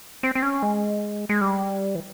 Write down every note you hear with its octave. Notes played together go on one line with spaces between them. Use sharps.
C4
C4
C#4
G#3
G#3
G3
E3